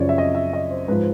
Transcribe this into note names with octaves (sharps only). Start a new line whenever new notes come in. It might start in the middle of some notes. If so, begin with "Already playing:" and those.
Already playing: F#2 C#3 F3 C#5 D5
E5
D#5
E5
D#5
C5
G#2 F3 B4